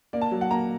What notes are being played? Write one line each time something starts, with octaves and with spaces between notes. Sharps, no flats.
A#3 D5
A5
F#3
F#5
A#3 A#5